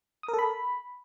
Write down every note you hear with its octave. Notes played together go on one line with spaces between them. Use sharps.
D#6
A#4
A4
B5